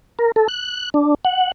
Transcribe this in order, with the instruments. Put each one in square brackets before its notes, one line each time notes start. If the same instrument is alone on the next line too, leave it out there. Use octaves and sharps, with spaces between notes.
[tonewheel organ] A#4
A4
F#6
D4
F#5